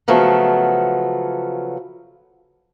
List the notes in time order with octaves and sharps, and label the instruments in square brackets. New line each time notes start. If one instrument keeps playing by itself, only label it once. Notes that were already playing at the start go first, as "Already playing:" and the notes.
[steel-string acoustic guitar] C#3 F3 F#3 A3 B3